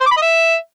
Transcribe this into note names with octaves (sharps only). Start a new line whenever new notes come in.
C5
D6
B5
D#5
E5